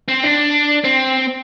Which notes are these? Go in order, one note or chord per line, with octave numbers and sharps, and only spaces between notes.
C4
D4
C4